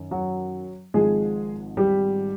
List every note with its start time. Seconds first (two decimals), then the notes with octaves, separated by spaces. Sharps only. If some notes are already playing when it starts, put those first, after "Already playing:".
Already playing: F#2 D#3
0.11 F#3 F#4
0.94 G#1 G#2 F3 G#3 G#4
1.77 G3 G4